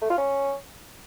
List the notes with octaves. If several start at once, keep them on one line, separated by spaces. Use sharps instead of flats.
A3
F4
C#4